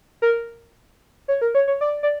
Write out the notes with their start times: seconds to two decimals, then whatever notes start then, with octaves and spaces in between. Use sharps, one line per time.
0.22 A#4
1.28 C#5
1.41 A#4
1.55 C#5
1.68 C#5
1.81 D5
2.03 D5